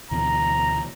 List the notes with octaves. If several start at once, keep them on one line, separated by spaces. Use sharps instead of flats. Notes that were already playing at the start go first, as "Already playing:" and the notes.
D2 B2 E3 A#5